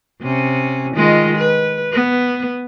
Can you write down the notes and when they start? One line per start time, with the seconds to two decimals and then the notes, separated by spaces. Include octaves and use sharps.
0.21 C3 C#4
0.95 D#3 G#3 F4
1.37 B4
1.92 B3